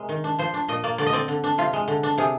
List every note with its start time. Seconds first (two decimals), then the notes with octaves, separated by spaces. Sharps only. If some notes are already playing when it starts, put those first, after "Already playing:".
Already playing: C3 G#3 A#4
0.09 D#3
0.24 D4
0.39 F3 C5
0.54 D4
0.68 A#2 D#5
0.84 A#3 D5
0.98 D3 D5
1.06 D#5
1.13 C4 D5
1.28 D3
1.44 D4
1.58 C3 F4
1.73 G#3
1.88 D3
2.03 D4
2.18 C3 G#4